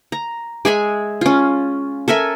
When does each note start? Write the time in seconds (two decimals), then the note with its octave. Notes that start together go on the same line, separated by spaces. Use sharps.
0.12 A#5
0.65 G#3 G#4 E5 G#5
1.21 C#4 F4
2.08 A4 A#4 E5 G#5